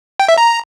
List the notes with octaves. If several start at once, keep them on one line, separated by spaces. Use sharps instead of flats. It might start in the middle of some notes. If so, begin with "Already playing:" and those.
G5
E5
A#5